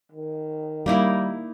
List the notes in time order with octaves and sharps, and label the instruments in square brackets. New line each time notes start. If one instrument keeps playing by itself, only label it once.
[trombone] D#3
[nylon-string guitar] G3 [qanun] A#3 D#4 E4